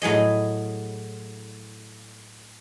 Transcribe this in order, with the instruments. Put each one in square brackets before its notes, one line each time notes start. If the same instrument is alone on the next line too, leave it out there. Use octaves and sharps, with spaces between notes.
[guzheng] A2 F#3 G#4 D#5